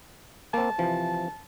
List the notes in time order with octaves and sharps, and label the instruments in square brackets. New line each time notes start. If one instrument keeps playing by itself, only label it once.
[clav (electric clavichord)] A#3 C4 [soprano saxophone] A5
[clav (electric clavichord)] C3 E3 F3